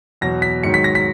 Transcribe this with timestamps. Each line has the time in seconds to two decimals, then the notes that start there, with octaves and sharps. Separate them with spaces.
0.21 E2 B2 F#3 A#6
0.42 B6
0.63 G#2 D#3 F#3 C#7
0.74 B6
0.84 A#6
0.95 B6